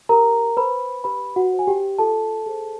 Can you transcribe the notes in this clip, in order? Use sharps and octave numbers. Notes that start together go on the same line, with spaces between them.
G4 A#4 A#5
B4 C5 B5
G4 B4 B5
F#4 F#5
C5
G#5
G4 G5
F4 A4 A5
G#4 C5